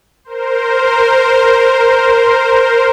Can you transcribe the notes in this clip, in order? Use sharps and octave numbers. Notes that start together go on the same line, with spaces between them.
A#4 C5